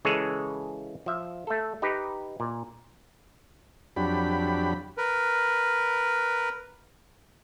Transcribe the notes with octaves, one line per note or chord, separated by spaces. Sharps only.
C#3 E3 G#3 G#4 A4 C#5
F3 E5
A3 A4
D#4 G4 B4
A#2
F2 F#3 D4 G4 B5
A#4 B4